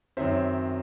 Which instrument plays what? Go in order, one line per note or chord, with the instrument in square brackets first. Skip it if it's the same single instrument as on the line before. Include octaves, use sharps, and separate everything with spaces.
[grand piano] F#2 D#3 F#3 C4 C5 E5